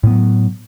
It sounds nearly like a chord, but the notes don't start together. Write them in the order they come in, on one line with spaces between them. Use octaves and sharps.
A2 B3 F#3